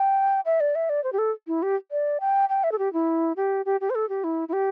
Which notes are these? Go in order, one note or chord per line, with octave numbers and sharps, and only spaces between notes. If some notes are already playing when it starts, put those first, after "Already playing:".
Already playing: G5
E5
D5
E5
D5
C5
G4
A4
E4
G4
D5
G5
G5
E5
A4
G4
E4
G4
G4
G4
C5
A4
G4
E4
E4
G4